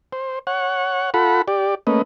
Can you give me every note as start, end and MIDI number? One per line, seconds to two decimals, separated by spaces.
0.12 0.39 72
0.47 1.10 73
0.47 1.10 78
1.14 1.42 65
1.14 1.42 69
1.14 1.42 78
1.14 1.42 83
1.48 1.75 67
1.48 1.75 74
1.87 2.02 57
1.87 2.02 58
1.87 2.02 61
1.87 2.02 71
1.87 2.02 75